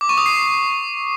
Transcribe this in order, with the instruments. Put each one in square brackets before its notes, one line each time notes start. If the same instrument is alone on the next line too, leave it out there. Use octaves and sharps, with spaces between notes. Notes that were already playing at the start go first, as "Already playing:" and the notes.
[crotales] D6
C#6
D#6
C7